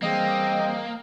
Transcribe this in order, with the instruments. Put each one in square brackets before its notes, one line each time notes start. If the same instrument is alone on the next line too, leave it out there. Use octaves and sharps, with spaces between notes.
[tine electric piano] E3 G3 G#4 [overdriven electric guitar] A#3 [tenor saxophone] C4 [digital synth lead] D#5